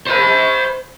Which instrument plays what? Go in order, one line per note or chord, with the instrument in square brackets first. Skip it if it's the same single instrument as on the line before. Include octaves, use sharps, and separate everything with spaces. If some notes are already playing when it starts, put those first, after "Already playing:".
[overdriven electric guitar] C5 B5